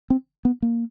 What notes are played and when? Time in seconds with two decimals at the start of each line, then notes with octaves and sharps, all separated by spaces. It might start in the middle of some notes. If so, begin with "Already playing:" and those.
0.10 C4
0.45 B3
0.62 A#3